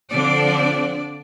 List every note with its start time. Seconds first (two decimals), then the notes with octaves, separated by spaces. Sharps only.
0.12 D3 F3 C4 D4 D5